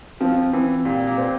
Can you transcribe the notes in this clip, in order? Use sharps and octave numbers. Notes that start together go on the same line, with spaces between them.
F3 C4
E3 C4
A#2 G4
A#2
C5